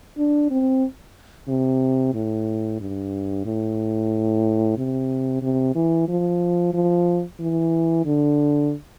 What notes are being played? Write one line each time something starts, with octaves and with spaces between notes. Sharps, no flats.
D4
C4
C3
A2
G2
A2
C3
C3
E3
F3
F3
E3
D3